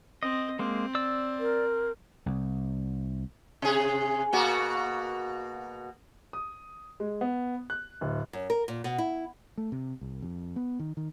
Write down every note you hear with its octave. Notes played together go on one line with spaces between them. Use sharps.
C4 D#5
G#3 A#3 C4
D5 E6
A#4
C2
C3 G#4
B2 A#3 F#4
D#6
G#3
B3
F#6
D1
F#2
A#4
A#2
B2
E4
A3
C3
C2
F2
B3
D#3
D#3